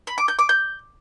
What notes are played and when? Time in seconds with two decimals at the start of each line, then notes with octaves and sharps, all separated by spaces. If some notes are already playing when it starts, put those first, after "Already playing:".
0.07 B5
0.18 D6
0.28 G6
0.39 D6
0.49 G6